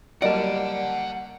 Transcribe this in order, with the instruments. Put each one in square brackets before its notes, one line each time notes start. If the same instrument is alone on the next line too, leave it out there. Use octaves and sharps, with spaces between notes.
[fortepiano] F#3 G3 A#3 [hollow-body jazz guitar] D5 [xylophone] D#5 [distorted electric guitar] F#5 A5